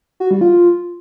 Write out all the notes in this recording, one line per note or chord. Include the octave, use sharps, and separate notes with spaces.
F#4
G3
F4